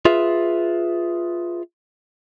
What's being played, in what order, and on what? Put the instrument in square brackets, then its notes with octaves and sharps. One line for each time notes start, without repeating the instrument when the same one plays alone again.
[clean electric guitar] F4 G#4 B4 E5